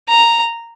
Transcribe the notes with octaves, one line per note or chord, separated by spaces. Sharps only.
A#5